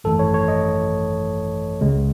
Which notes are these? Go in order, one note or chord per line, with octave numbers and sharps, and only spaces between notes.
G#1 F#2 E3 A3 A4
C#5
C#5
D#5
C#2 C#3 G#3